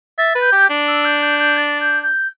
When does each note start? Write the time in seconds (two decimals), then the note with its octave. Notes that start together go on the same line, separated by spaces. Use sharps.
0.18 E5 A6
0.35 B4
0.41 G6
0.53 G4
0.70 D4
0.87 E6
1.04 G6
1.21 G6
1.39 G6
1.56 A6
1.80 G6
2.03 G6